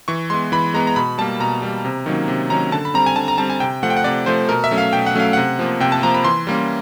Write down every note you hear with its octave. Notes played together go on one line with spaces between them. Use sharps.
E3 C#6
G#3 B3 C6
E3 B5
G#3 B3 A#5
A#5
B2 B5
G3 A#3 A5
B2 A#5
G3 A#3
C3
D#3 F#3 A#3 C#4
C3
D#3 F#3 A#3 C#4 A#5
D3 A5
B5
G3 C4 A#5
G#5
D3 A5
A#5
G3 C4 A5
G#5
C3 G5
F3 A3 F#5
G5
F#5
C3 D5
F3 A3 C5
B2 A#4
E5
F#3 A3 C#4
F5
B2 G5
F#5
F#3 A3 C#4 F5
C3 F#5
F3 A#3
C3 G5
A5
F3 A#3 A#5
B5
E3 C6
G3 A#3 C#4